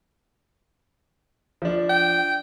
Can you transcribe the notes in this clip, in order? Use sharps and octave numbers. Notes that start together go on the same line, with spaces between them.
F3 D4
G5